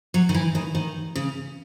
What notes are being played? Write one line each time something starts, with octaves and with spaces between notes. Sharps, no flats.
F#3
D#3
E3
D#3
D#3
C#3